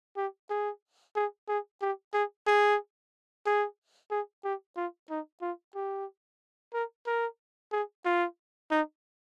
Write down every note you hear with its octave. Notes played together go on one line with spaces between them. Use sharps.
G4
G#4
G#4
G#4
G4
G#4
G#4
G#4
G#4
G4
F4
D#4
F4
G4
A#4
A#4
G#4
F4
D#4